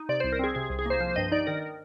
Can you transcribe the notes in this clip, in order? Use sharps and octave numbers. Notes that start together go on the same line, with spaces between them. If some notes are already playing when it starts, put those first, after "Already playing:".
Already playing: D#4
C3 D5
C2 C5
A#4
C4 G#4
C3 G#4
C2
G#4
A#3 C5
F3 C5
G2 D#5
D#4 D5
D#3 A#4